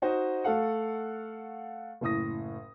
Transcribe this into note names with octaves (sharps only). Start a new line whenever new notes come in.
D#4 F#4 C5 D#5
A3 A4 F5 F#5
F#1 A2 D#6 A#6